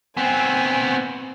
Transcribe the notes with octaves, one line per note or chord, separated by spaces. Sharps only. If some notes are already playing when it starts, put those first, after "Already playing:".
B3 C4 G#5